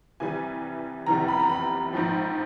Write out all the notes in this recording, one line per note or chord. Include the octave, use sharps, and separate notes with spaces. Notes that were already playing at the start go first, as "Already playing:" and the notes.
C2 C3 E3 G3 G#5
F1 E2 C3 E3 G3 A#5
B5
A#5
B5
A#1 G#2 F3